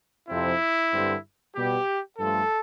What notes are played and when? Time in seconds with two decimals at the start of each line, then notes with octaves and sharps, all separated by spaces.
0.28 F2 C3 F3 C4 E4
0.92 G2 D3 G3 C4
1.55 B2 G3 B3 G4
2.19 G2 F3 A3 A4